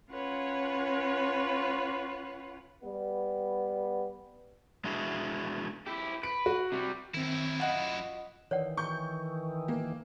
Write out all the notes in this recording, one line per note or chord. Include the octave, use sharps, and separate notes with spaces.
C#4 F4 B4 C#5 F#5
G3 B3
G#3 D4 E4 F#4 G#4
E4 G4
B4 D7
F#4
C3 G3
F#2 D#3 C4 E4
F4 F#4 D#5 F#5
D#3 E3 C#5 D5 F#5
C#6 G6
A#3